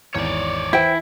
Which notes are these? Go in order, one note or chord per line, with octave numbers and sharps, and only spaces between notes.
G#1 E2 C#5 D5
E3 E4 C5 G5